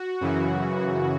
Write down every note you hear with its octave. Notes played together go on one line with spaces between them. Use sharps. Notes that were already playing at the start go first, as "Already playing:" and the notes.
Already playing: F#4
F#2 C#3 E3